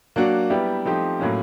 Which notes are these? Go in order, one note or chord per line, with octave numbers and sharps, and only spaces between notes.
F#3 A#3 D4 F#4
G3 B3 E4 G4
F3 A3 C4 D#4 G4
A2 F#3 A#3 C#4